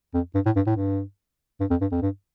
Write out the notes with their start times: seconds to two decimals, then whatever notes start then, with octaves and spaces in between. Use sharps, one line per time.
0.14 F2
0.35 G2
0.45 A2
0.56 G2
0.66 A2
0.76 G2
1.60 G2
1.70 F2
1.81 G2
1.92 F2
2.02 G2